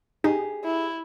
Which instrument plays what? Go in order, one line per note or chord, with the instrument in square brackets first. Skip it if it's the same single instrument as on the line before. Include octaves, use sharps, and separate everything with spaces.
[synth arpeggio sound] D#4 [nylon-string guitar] G4 G#4
[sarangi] E4